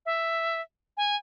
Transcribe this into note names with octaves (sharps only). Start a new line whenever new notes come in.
E5
G#5